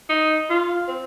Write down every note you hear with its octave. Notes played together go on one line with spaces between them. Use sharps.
D#4
F4
C4